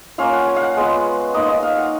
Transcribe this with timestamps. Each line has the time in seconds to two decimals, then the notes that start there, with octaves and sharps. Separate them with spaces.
0.18 A#3 C#4 F4 F5
0.33 F#5
0.47 G#5
0.56 F5
0.62 F#5
0.77 G#3 B3 F4
1.34 A#3 D#4 D#5
1.48 D#5
1.63 F5
1.77 F#5